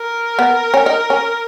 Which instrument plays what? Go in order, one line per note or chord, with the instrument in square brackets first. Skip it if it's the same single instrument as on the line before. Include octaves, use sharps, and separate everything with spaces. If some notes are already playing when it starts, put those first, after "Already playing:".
Already playing: [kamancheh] A#4
[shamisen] B3
C#4
D#4
C#4